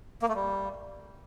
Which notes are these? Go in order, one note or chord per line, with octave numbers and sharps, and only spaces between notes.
A#3
A3
G3